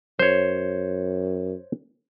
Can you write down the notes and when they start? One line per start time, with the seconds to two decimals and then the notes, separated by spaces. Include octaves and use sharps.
0.19 F#2 C5 C#5